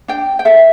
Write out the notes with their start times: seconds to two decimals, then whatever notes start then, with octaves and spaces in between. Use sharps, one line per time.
0.08 D4 G5
0.39 G5
0.45 A4 E5